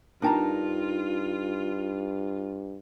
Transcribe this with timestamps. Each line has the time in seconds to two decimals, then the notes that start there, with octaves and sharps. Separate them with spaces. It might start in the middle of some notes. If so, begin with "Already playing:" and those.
0.22 G2 D4 D#4 F4 A#4 G5 A5 A#5